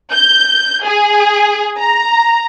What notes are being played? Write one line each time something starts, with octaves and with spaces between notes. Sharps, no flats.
G6
G#4
A#5